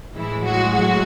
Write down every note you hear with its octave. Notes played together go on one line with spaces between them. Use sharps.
A2 E3 G#3 E4
F#3 F#4
F#3 F#4